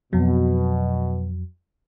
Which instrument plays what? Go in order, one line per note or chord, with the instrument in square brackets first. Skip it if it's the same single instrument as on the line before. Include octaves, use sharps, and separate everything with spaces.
[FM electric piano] F2 F#3 [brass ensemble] B2